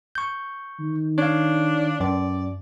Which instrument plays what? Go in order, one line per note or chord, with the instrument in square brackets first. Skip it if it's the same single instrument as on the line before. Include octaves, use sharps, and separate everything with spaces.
[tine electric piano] C#6 G6
[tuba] D#3
[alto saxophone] D4 [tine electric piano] C#5 F5
[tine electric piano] F#2 [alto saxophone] D5